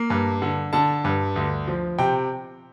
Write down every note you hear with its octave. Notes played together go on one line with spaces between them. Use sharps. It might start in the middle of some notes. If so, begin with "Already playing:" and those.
Already playing: A#3
G2
D3
D3 A5
G2
D2
F3
C3 G5